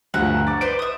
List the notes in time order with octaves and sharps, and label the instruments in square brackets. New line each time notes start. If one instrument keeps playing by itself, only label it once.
[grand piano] D2 G2 F3 [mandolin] F#5 A#5
[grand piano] D6 A6
[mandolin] B4 C5 D5 [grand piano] D7
[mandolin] E5 D#6